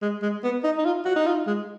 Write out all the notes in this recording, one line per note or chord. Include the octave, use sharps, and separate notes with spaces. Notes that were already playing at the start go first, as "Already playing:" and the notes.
G#3
G#3
B3
D#4
D#4
F4
F#4
D#4
F4
G#3